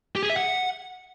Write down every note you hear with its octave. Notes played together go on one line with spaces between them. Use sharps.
G4
G#4
E5
F#5